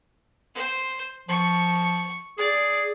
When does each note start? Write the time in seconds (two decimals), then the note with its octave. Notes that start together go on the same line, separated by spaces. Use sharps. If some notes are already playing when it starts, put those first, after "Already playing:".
0.55 C5
1.29 F3 C#6
2.38 G#4 D5